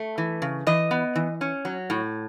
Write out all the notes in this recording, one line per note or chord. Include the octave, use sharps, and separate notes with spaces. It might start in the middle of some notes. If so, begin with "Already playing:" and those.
Already playing: A3
E3
C#3
E3 D#5
B3
E3
C#4
F#3
A2